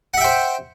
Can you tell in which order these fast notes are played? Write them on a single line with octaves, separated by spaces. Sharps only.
F#5 E5 G5 C5